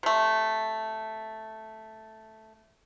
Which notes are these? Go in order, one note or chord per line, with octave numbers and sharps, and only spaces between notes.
C3 A3